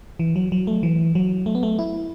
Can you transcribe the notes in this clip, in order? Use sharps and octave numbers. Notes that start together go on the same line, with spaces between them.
E3
F#3
F#3
A3
E3
F#3
A3
B3
A3
E4